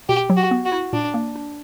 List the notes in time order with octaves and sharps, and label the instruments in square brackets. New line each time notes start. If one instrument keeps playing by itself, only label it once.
[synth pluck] B2 [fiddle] G4
[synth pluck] F#3
[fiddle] F#4
[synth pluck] B3
[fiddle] F#4
[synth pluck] E4
[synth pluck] A#2 [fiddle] D4
[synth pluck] A#3
D4